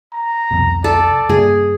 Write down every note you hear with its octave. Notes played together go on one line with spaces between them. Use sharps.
A#5
C2 F2 B2
A4 D5
G2 C#3 A#3 G#4